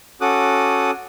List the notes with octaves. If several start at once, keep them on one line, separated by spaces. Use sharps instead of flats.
C#4 F#4 A4 D6 D#6 F#6